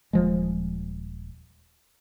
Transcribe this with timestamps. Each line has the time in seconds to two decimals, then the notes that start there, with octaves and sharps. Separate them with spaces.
0.13 D#1 F3 G#3